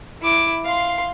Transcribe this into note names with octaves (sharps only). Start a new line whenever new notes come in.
E4 D6
F5 C6